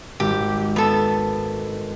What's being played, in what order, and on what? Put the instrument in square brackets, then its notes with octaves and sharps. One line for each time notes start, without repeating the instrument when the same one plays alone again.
[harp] G#1 [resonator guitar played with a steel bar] G4
[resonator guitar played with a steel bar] B3 A4